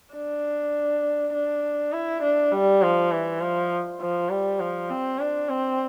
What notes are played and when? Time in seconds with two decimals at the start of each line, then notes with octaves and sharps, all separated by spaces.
0.15 D4
1.34 D4
1.92 E4
2.23 D4
2.52 G3
2.82 F3
3.11 E3
3.41 F3
4.01 F3
4.30 G3
4.60 F3
4.90 C4
5.19 D4
5.49 C4